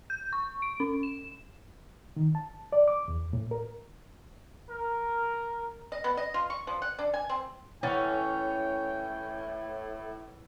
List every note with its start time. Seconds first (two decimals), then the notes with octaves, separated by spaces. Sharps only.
0.10 G6
0.33 C#6
0.62 D7
0.80 C#4
1.03 E7
2.16 D#3
2.35 A5
2.72 D5
2.88 D6
3.08 E2
3.33 A2
3.51 A#4
4.69 A#4
5.92 D#5
6.04 B3
6.17 D#5
6.34 F4
6.50 C#6
6.67 F3
6.82 F#5
6.99 D4
7.14 G#5
7.29 C4
7.83 A2 E3 C#4 F#5 G5 A6